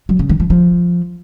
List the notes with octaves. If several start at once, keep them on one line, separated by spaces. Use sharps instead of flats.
F#3
C#3
D#3
F3
F3